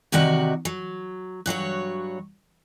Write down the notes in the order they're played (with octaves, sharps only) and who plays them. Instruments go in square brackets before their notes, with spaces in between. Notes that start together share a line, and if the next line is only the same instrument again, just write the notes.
[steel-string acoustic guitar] C3 D#3 D#4 F#4 D5 F#5
F#3
G2 F#3 F#4 C#5